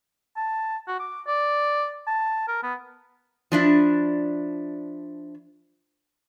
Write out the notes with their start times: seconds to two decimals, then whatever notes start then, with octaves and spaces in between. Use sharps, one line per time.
0.37 A5
0.88 F#4
0.99 D6
1.27 D5
2.07 A5
2.48 A#4
2.63 B3
3.52 F3 D4 E4